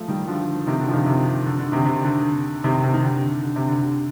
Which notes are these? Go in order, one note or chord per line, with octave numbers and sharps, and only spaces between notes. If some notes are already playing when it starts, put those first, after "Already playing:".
Already playing: F3 A3
D#3 G3
D3 F3
C3 D#3
D3
F3
C3 D#3
C3
D3
D3
C3 D#3
C3
D3
C3 D#3
C3
D#3
D3
D3
C3
D3
D3